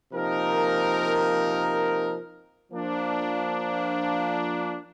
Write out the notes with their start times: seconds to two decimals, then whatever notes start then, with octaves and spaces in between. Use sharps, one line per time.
0.12 C3 F3 A#3 D#4 A#4
2.72 F3 A#3 D4